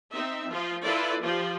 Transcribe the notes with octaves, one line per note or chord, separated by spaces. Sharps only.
C4 D#4 E5
F3 F4
E4 F4 A4 B4 D5
F3 F4 G4